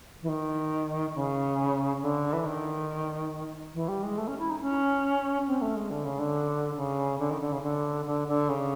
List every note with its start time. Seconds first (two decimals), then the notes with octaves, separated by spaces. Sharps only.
0.22 E3
0.29 D#3
1.15 C#3
2.02 D3
2.33 E3
2.45 D#3
3.74 E3
3.88 G3
4.03 G#3
4.18 A3
4.28 C#4
4.39 E4
4.50 D#4
4.61 C#4
5.47 C4
5.62 A3
5.76 G#3
5.91 D3
6.05 C#3
6.19 D3
6.77 C#3
7.19 D3
7.30 D#3
7.41 D3
7.53 C#3
7.63 D3
8.06 D3
8.28 D3
8.49 C#3